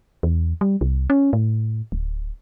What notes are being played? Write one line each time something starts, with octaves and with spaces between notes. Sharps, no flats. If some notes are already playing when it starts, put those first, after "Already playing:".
E2
G3
C2
C#4
A2
D1